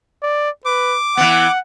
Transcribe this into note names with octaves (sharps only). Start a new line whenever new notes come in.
D5
B4 D6
E3 B3 F#5